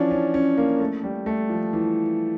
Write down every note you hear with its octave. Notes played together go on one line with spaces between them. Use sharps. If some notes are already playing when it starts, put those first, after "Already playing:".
Already playing: E3 F3 C#4 D4
C#4
C#4
A#3
A3
G3
A3
F3
E3